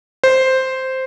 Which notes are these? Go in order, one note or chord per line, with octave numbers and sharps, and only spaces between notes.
C5